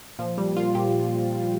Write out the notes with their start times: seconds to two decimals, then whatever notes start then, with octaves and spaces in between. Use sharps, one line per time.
0.19 A#2 F3
0.38 A#2 G3
0.57 A#2 F4
0.75 A#2 G4